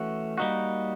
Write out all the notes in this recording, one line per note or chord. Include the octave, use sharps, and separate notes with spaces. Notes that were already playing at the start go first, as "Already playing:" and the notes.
Already playing: E3 A3 C#4 F#4
G3 A#3 D#4 F#4